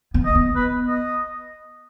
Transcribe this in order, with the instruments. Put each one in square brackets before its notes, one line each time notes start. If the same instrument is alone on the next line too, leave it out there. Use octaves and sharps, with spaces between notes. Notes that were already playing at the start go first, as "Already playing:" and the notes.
[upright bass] B3
[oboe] D#5
[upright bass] B3
[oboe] B4
D#5